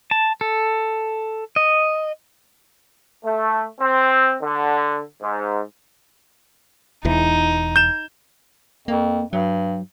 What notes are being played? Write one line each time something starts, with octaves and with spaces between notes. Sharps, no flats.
A5
A4
D#5
A3
C4
D3
G#2
E1 E2 E3 D#4
G6 E7
F2 A#3
G2 F#3